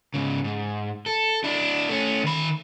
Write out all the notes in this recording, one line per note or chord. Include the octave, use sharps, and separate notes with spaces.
G#2 C#3
G#2
A4
D4 E4
A3 C#4
D#3 B5